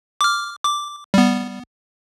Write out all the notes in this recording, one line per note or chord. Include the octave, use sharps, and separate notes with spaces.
D6 F6
D6
G3 B3